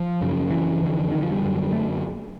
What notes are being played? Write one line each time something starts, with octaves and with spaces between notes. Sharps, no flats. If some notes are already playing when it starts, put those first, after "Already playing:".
Already playing: F3
F#2 C#3
E3
F2 D3
D#3
F3
G3
F#2 D3
A3